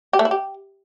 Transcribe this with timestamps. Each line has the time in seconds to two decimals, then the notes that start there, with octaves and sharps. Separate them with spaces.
0.13 G4
0.19 A3
0.25 E4
0.31 G4